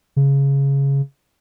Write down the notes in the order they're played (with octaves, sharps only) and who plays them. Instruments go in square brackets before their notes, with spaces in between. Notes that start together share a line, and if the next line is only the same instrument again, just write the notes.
[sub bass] C#3